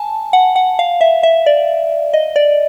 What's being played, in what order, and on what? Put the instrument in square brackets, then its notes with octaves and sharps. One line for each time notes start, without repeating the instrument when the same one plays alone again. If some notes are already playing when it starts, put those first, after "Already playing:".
Already playing: [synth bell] G#5 A5
F#5
F#5
F5
E5
E5
D5
D#5
D5